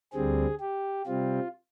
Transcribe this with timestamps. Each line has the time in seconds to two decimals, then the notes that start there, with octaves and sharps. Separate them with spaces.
0.13 D2 D3 G3 C4 G#4
0.60 G4
1.06 C3 G3 C4 F4